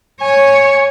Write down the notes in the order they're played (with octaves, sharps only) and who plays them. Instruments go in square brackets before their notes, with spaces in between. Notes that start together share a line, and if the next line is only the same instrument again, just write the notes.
[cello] C#5 [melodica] G#5